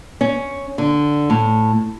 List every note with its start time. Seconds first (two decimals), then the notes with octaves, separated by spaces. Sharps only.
0.21 C#4
0.78 D3
1.30 A2